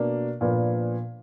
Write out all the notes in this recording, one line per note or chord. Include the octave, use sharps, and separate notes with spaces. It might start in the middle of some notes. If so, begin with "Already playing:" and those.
Already playing: B2 A#3 D4
A#2 F3 B3 D4